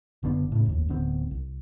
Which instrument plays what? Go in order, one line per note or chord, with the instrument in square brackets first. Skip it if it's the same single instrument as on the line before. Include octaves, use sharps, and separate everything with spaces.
[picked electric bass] F#1 D3 B3 D4
A2 C#3
F1 D#2
D1 D3 B3 C4
C2